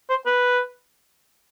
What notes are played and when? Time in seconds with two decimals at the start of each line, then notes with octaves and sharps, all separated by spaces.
0.10 C5
0.26 B4